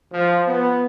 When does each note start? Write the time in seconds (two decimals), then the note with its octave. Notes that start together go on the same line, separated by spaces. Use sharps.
0.12 F3
0.47 B3